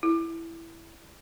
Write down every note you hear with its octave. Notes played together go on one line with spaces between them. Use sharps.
E4